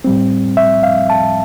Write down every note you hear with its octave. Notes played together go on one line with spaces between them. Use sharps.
A2 G3 C4
E5
F5
A5